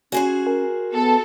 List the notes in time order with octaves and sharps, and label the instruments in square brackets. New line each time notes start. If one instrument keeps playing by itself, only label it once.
[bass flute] C#4 [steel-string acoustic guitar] F#4 G#4 C5 [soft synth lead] G#5
[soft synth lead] A#4
[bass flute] B3 [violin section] A4